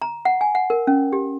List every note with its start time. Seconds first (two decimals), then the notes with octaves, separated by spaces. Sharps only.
0.02 A#5
0.25 F#5
0.41 G#5
0.55 F#5
0.70 A#4
0.87 C#4
1.13 G4